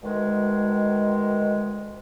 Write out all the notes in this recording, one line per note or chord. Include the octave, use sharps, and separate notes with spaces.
D2 B2 D#3 G#3